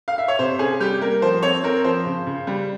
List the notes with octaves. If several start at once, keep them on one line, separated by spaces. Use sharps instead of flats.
F5
E5
C#5
C3 C5
C#4 G#4
G3 G4
A#3 A#4
F3 C5
C4 C#5
C4 A#4
F3 C5
C#3
C#3
G3